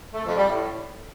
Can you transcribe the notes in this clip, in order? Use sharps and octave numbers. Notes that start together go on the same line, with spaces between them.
A3
F2
G3
A2